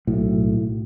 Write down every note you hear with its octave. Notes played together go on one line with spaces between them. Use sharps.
B1 A2